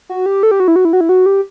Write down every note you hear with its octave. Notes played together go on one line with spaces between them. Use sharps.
F#4
G4
A4
G4
F#4
E4
F#4
E4
F#4
E4
F#4
G4